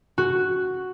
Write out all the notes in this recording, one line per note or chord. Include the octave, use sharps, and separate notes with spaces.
F#4